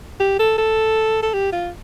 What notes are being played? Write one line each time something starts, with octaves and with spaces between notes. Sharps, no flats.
G4
A4
A4
A4
G4
F4